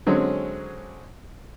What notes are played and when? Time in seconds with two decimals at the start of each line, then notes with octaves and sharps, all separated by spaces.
0.06 D3 F#3 G#3 C4 C#4